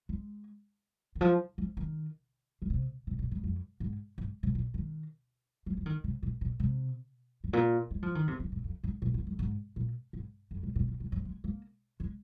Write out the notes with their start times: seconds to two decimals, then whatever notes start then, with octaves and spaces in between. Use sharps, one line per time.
0.09 G#3
1.15 D#3
1.21 F3
1.58 F3
1.77 D#3
2.62 D#3
2.70 C3
3.07 C3
3.19 A#2
3.31 G#2
3.44 F2
3.80 G#2
4.18 G#2
4.43 C3
4.55 A#2
4.74 D#3
5.66 F3
5.77 F3
5.86 D#3
6.04 C3
6.23 A#2
6.41 A#2
6.60 C3
7.44 G#2
7.53 A#2
7.91 G#3
8.02 F3
8.15 D#3
8.28 C3
8.40 D#3
8.52 A#2
8.64 F2
8.84 G#2
9.02 A#2
9.14 G#2
9.27 F2
9.39 G#2
9.76 A#2
10.13 G#2
10.51 F2
10.63 A#2
10.76 A#2
10.88 A#2
11.00 C3
11.12 G#2
11.25 G#3
11.44 A#3
12.00 G#3